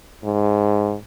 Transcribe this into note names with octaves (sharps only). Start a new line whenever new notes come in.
G#2